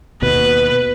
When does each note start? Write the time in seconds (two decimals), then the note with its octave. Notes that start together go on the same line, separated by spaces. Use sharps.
0.22 D#2 B2 B4